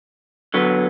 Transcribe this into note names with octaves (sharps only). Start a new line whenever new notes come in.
D3 F#3 B3